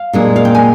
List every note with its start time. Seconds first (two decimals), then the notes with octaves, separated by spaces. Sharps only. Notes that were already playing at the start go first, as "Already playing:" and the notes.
Already playing: F5
0.13 A#2 G#3 D4
0.36 F5
0.45 G5
0.55 G#5